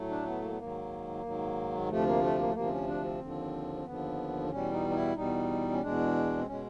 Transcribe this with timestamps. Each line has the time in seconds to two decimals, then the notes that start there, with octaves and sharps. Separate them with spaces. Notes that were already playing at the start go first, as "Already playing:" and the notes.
Already playing: A2 F#3 A3
0.09 D4
0.26 B3
0.42 A#3
0.50 B3
0.58 G#2 D#3 F#3 A#3
1.24 G#2 D#3 F#3
1.89 D2 C3 F3 A3
2.06 A#3
2.22 A3
2.38 A#3
2.48 A3
2.54 D2 C3 F3 A#3
2.67 C4
2.70 C#4
2.87 D4
3.03 C4
3.20 D#2 D3 F3
3.75 C4
3.85 D#2 D3 F3 B3
4.51 E2 B2 G3 C#4
4.72 D#4
4.90 D#4
4.94 E4
5.16 E2 B2 G3 D#4
5.72 C#4
5.82 E2 B2 G#3 D4
6.37 C4
6.47 B2 G#3 C#4